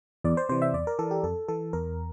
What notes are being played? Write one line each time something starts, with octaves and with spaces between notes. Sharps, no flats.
E2 D5
C5
C3 E3 C5
E5
E2 D5
A#4
E3 A4
G4
F2 A4
E3 A4
E2 A#4